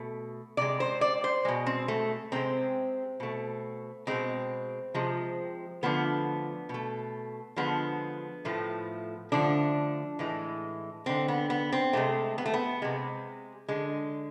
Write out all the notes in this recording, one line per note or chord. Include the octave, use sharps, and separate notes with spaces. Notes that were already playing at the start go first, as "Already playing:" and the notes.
Already playing: B2 A3
C3 G#3 D5
C5
D5
C5
B2 G#3
C4
A3
C3 G#3 C4
B2 A3
B2 G#3 C4
C3 F3 G#3
D3 F3 A3 B3
B2 A3
D3 F3 G#3 B3
A2 F3 A3
D3 F3 A3 D4
A2 E3 G#3
D3 G#3 C4
B3
B3
C4
C3 G#3 A3
B3
A3
B3
C3 G#3
D3 G#3